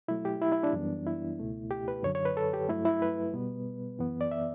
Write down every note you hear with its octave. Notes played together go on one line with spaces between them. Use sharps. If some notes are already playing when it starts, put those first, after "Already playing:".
B2 F#3 A3 E4
G4
E4
E4
D4
F#2 E3 G3 B3
E4
C#2 B2 A3
G4
B4
F#2 D3 F#3 C#5
C#5
B4
A4
G4
G2 F#3 A3 E4
E4
B4
B2 G3 B3
F#2 E3 B3
D5
E5